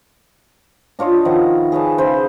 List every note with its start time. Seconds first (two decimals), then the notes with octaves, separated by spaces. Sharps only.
0.99 D4 F4 C#5 D#5
1.25 D#3 F3 E4 F#5
1.72 G#4 B4 C#5 A5
1.98 C#3 E4 C5 B5